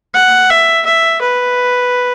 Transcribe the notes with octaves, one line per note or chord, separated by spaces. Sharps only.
F#5
E5
E5
B4